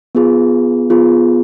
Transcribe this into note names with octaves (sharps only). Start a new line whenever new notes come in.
B3 F4 G#4
B3 F4 G#4